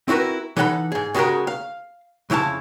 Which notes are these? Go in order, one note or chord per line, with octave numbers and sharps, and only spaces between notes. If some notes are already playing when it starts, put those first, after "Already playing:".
C4 E4 F#4 A#4 B4
E3 D#4 A4 F#5 A#5 B5
G#2 G#4
C#3 G#3 F#4 G4 A#4
F5
F2 C#3 E4 F5 A5